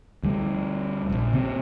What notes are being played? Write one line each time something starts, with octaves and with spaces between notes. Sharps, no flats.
D2 G3
E1 A#1
C#3 C4